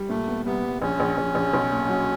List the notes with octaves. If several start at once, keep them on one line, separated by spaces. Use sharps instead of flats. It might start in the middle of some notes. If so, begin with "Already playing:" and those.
Already playing: G3
A#2 A3
B3
C2 B3
C2
A#1 C#4
A#1
A#1
A#1
B1
A#2
F#3